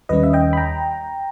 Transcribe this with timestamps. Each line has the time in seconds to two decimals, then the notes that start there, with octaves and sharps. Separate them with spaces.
0.09 D#2 D#3 G3 C#4 B4 D#5
0.23 E5
0.33 D#5 G5
0.53 B5
0.57 G5 A#5